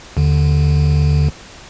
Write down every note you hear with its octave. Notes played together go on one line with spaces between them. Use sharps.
D#2 D3